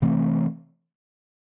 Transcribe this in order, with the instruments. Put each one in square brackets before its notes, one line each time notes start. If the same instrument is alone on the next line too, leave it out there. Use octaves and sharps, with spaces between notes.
[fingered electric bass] C3 E3 A3 C4